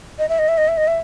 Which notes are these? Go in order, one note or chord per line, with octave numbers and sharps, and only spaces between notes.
D#5
E5
D#5
E5
D#5
E5
D#5
E5